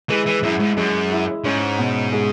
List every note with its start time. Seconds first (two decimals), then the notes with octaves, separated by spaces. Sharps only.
0.09 E3 G#3
0.26 E3
0.43 F#2 E4
0.60 G#2
0.77 F#2 G#3
1.11 E4
1.44 G#2 C#4
1.79 B2
2.12 G#3